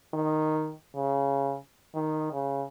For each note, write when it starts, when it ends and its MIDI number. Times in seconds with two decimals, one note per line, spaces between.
0.14 0.72 51
0.96 1.56 49
1.95 2.32 51
2.33 2.64 49